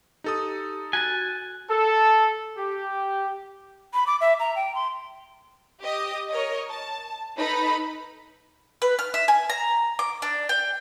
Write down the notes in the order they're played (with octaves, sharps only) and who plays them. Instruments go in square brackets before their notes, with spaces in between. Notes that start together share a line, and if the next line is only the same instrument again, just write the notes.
[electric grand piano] D#4 A4 D#6 [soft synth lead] G4
[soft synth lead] F#4 [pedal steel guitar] G#5 [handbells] F#6 A6
[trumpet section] A4
G4
[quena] B5
D6
E5
A#5
G5
C6
[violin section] G4 D#5 D#6
A#4 C#5 D#5
A5
D#4 A4 B4 B5
[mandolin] B4
F6
E5
G#5
A#5
D6
D4
G5